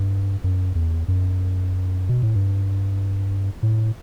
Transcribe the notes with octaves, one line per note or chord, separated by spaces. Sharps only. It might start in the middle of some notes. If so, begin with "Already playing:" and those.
Already playing: G2
F#2
E2
F#2
B2
A2
G2
A2